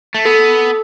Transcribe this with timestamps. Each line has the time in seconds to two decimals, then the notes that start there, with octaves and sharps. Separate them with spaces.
0.15 A3
0.25 B3 A4